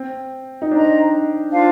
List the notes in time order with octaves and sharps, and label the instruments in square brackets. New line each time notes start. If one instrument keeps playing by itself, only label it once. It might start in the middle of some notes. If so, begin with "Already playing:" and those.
Already playing: [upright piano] C4
D#4
[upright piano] D4 [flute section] C5 D#5 A#5
[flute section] D4 F4 C5 F5